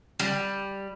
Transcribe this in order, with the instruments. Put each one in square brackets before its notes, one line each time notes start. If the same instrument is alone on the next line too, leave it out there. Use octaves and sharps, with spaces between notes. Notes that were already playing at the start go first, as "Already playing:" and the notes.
[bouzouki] G3